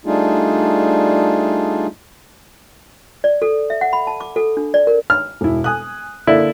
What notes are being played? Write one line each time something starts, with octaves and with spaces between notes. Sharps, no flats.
G3 A3 D4 D#4 F4 G#4
D5
A4
E5
F#5
B5
A5
D6
A4
D4
D5
A#4
F6
E1 E4
G#5 D#6 F#6
D3 A#3 E4 D5